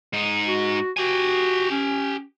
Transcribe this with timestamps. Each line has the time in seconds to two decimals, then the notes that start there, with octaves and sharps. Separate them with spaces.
0.13 G#2 D#4
0.46 F#4
0.97 F#4 G4 G#5
1.71 C#4